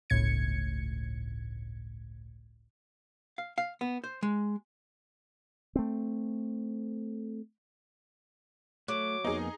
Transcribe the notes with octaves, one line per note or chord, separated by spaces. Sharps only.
G1 C#2 A2 G#6 C#7
F5
F5
B3
C5
G#3
A3 C4
F#3 A3 D6
F2 A#3 B3 D#4 G#4